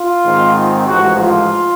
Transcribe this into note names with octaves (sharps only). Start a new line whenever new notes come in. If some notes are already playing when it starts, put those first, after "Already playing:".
Already playing: F4
G#2 D#3 G#3 C4
A1 G#2 F3 F#4
F4